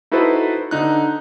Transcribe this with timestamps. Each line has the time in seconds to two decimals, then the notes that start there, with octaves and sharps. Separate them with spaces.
0.12 D#4 E4 F#4 A4 B4 C5
0.71 D3 D#4 F#6